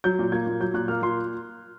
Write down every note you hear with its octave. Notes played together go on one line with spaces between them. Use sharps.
F#3 G6
A#2
A#3 G#6
A#2
F#3 G6
A#2 F#6
A#3 F6
A#2 C6